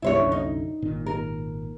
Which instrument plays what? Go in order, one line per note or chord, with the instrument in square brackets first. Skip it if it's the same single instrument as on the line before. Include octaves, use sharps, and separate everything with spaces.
[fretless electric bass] C2 G2 [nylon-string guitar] E4 C5 C#5
[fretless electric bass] C2 F#2 D3
[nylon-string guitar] D#4
[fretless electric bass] G#1 A#2 D#3
[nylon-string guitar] A#4